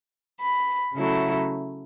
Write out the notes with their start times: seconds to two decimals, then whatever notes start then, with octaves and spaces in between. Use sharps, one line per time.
0.40 B5
0.94 C#3 F#3 A3 E4